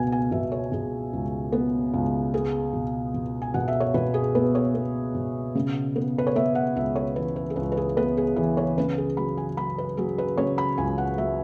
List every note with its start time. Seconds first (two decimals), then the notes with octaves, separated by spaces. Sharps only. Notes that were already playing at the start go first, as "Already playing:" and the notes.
Already playing: C#2 B2 B3 G#5
0.12 G#5
0.32 B2 E5
0.52 C#5
0.72 B2 G#4
1.13 C#2
1.52 B3
1.94 C#2
2.34 B3 G#4
2.73 B2
3.14 B2
3.42 G#5
3.54 B2 F#5
3.68 E5
3.80 C#5
3.94 B2 B4
4.14 G#4
4.35 B3 B4
4.55 C#5
4.75 B3
5.15 B2
5.55 C#3
5.96 B3
6.18 B4
6.27 C#5
6.35 B3 E5
6.55 F#5
6.75 C#2 E5
6.96 C#5
7.16 E3 B4
7.36 B4
7.50 G#4
7.56 C#2 B4
7.72 B4
7.77 G#4
7.97 B3 B4
8.17 G#4
8.36 E3
8.57 C#5
8.78 C#3 B4
8.98 G#4
9.17 F#3 B5
9.38 G#5
9.57 F#3 B5
9.78 B4
9.97 F#3 G#4
10.18 B4
10.38 C#3 C#5
10.58 B5
10.78 C#2 G#5
10.98 F#5
11.18 F#3 E5